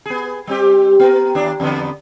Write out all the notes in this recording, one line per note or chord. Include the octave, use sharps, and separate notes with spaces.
B3 G#4
G3 C4 G4
B3 A#4
D#2 D4
E2 D3 B3